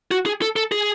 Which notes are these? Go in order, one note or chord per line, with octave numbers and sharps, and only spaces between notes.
F#4
G#4
A4
A4
G#4